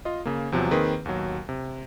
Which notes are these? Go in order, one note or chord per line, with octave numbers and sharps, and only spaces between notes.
F4 D#5
C#3 A#3
E2 C3 F3 F#3
D#3 A#3 C4 G#4 B4
D#2 B2 F#3
C3